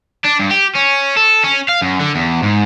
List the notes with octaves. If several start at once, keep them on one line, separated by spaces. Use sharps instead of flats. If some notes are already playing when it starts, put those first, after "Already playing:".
D4
G2
G4
C#4
A4
C#4
F5
F#2
D3
E2
G#2